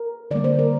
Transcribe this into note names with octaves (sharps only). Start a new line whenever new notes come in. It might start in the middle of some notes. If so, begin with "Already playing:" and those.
Already playing: A#4
D3 G3 A#3 D5
C5
A#4